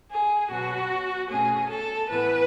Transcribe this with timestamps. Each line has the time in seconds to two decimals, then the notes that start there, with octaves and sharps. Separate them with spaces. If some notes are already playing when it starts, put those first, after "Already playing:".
0.11 G#4
0.51 B2 F#3 B3 F#4
1.29 B2 A3 C#4 G#4
1.69 A4
2.09 A2 E3 B3 B4